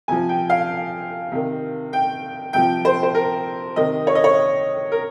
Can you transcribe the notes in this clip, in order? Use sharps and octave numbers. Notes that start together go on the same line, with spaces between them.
C3 F3 G#5
G5
F5
C3 D#3
G5
C3 F3 G5
C5
C5
A#4
C3 D#3 D#5
C#5
D#5
C#5
A#4